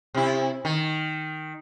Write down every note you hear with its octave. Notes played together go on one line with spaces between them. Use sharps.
C3 E4
D#3